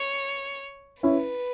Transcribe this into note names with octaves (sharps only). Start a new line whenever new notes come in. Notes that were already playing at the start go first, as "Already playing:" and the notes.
Already playing: C#5
C#4 E4 B4